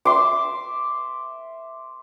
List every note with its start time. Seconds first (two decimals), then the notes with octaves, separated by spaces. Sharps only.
0.05 E5 C6 D6